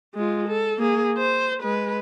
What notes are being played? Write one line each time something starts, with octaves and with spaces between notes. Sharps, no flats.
G#3 F4
A4
A#3 G#4
C5
G#3 B4